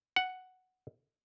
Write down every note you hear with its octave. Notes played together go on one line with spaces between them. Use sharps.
F#5